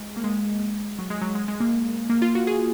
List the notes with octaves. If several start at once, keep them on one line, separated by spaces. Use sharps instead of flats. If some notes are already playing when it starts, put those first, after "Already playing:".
Already playing: G#3
A#3
G#3
F#3
G#3
F#3
G#3
G#3
A#3
A#3
F4
F#4
G#4